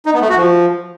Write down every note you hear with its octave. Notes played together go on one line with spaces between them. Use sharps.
D#4
B3
A3
F#4
F3